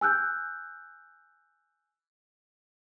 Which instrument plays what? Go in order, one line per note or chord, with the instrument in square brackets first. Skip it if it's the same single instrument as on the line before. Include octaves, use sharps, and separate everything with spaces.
[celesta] G#5 E6 F#6 G6